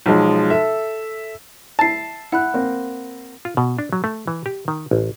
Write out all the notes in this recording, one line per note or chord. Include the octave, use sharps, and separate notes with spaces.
B1 F3 G#3
A4 E5
E4 A5 A6 C7
E4 F#5 B5 F#6
A#3 C4
F4
B2
D4
F#3
A3
E3
G4
D#3
A1